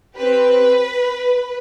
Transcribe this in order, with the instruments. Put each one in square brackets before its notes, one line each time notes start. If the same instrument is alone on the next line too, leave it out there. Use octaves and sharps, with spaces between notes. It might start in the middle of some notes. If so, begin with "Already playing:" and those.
[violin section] C4 G4 B4